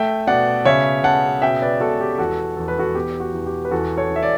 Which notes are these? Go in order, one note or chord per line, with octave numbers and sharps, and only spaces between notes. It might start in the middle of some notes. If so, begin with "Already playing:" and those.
Already playing: A3 E5 G5
B2 D5 F#5
C#3 C#5 E5
C#3 F#5 A5
B2 E5 G5
B4 D5
B2 F#4 A4
G4
E2 F#4 A4
E2 A4
B4
F#4 A4
B3 G4
F#4
E2
G4
B4
E2 F#4 A4
A4 C#5
E2
E5
D5